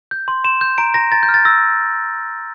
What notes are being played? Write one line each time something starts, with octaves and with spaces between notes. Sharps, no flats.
G6
C6
C6 E7
G6
A#5 D7
A#5 A#6
A#5 A6
G6
F6
A6
E6 A#6